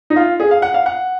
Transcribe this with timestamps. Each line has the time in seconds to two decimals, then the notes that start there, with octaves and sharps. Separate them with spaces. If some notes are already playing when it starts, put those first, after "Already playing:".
0.10 D#4
0.16 F4
0.40 G#4
0.51 F5
0.62 F#5
0.74 F5
0.86 F#5